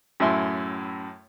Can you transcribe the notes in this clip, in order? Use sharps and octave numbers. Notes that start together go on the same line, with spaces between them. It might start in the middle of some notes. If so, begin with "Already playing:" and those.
F#2 A2 E4 E5 C6